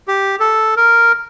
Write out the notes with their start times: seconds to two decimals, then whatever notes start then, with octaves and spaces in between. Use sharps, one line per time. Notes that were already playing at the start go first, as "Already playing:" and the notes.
0.08 G4
0.40 A4
0.77 A#4